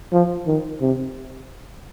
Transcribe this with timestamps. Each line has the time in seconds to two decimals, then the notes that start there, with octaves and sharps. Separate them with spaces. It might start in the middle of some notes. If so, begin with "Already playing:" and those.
0.12 F3
0.47 D#3
0.81 C3